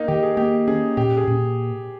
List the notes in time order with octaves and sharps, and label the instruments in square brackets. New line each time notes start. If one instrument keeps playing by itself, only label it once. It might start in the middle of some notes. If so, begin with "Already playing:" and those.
Already playing: [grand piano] A#3 D#4
[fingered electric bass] D#3 [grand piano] G4
[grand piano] G#4
[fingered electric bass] A#3 [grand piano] G4
[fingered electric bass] C#4 [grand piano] G#4
[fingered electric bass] A#2 [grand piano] G4
[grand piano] G#4
[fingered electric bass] A#2